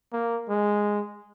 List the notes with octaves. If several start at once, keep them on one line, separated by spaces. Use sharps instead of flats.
A#3
G#3